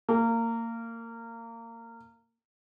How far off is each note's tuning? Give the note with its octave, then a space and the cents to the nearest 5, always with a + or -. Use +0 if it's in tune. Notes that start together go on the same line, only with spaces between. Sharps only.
A#3 -25